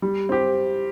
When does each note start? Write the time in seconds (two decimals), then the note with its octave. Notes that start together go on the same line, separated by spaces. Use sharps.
0.02 G3
0.29 C4 G4